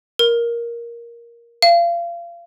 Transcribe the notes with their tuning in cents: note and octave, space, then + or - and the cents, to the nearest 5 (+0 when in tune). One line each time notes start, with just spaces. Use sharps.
A#4 +10
F5 -30